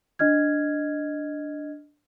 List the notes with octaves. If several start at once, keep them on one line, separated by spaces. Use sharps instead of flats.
D4 D#5 F6 G#6